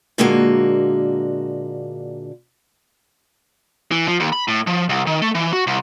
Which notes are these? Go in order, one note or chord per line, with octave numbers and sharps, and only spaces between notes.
A#2 D3 G#3 A#3 F#4
E3
F3
D#2
B5
A2
F3
C2
D#3
A3
E3
F#4
C2